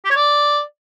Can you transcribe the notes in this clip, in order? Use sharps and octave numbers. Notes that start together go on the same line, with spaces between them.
G4
C#5
D5